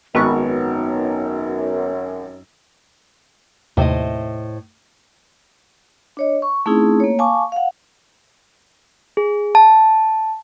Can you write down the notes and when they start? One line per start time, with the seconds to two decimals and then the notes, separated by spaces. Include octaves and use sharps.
0.15 G#1 F#2 B3 D#4 C#6
3.77 D#2 A2 C3 C5 D#5
6.17 D4 C#5 D#5
6.42 C#6
6.66 A3 C4 C#4 D#4 E4 G#4
7.00 A#3 C#5
7.19 F5 G#5 A5 C#6 D6
7.52 F5 F#5
9.17 G#4
9.55 A5